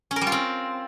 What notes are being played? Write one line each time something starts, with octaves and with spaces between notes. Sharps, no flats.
C#4
A#4
G3
F4
C4